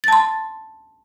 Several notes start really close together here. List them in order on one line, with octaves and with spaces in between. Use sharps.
A6 A5 C6